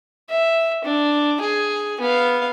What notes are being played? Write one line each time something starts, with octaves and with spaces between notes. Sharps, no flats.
E5
D4
G#4
B3 F5